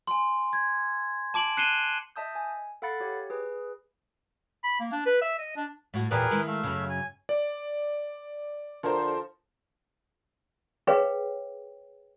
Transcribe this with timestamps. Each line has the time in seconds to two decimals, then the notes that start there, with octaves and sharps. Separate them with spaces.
0.07 G#5 C6
0.53 G#6
1.34 A5 D6 D7 F#7
1.57 F#6 C7 C#7 D#7 E7 G7
2.16 D#5 E5 A5 D#6 G6
2.35 G#5
2.82 A4 F5 F#5 B5 A6 C#7
3.00 G4 C#5
3.30 G#4 B4
4.64 B5
4.80 A#3
4.92 D4
5.06 B4
5.21 E5
5.38 D#5
5.56 D4
5.94 A2 F#4
6.11 E2 A#2 G4 G#4 A#4 B4
6.31 D#3 G#3 E4
6.47 A3 E5 F5
6.64 F#2 C#3
6.89 G#5
7.29 D5
8.83 D3 F3 A4 A#4 C5
10.87 G#4 B4 C#5 F5 G5